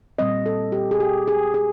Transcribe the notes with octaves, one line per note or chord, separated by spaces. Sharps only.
A#2 G3 C4 D#5
A4
G4
G#4
G4
G#4
G#4